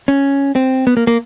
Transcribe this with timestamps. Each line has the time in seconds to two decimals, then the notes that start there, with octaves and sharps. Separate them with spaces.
0.08 C#4
0.55 C4
0.87 B3
0.97 A#3
1.07 A#3